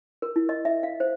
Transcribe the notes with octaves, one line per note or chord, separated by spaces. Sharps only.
A#4
E4
D#5
E5
F5
C5